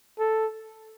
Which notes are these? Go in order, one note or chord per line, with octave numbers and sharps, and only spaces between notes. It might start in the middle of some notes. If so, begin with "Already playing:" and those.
A4